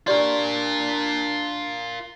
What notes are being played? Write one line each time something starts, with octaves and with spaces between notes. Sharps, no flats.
D4 F4 G4 A#4 D5 C6